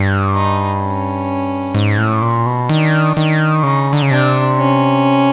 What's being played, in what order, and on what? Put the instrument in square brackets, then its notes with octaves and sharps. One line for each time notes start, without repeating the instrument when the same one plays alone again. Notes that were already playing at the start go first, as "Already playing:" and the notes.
Already playing: [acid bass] G2
[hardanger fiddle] D#4
C#4
[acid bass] G#2
A2
A#2
B2
[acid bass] D#3 [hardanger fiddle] D4
[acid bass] D#3
[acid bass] C#3 [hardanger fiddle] D#4
[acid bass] D3
C#3
[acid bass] C3 [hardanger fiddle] D4
[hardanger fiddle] C#4